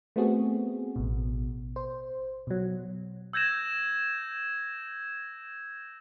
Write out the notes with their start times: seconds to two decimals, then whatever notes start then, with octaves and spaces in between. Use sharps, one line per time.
0.16 A3 B3 C4 F#4 G#4
0.96 A1 B2
1.76 C5
2.47 B2 F#3
3.33 E6 G6 G#6 A#6 E7